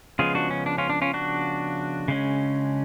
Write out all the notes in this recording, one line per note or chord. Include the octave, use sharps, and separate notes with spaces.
C#3 F3 G#3 B3 F4 G#4
D4 F#4
C#4
D4
C#4 F4
D4
C#4 F4
D4 F#4
C#3 G#3 C#4